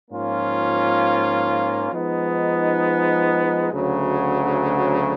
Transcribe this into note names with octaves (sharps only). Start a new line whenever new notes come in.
G#2 F3 A#3 C#4 F4
F3 G#3 B3 D#4
D2 C#3 F#3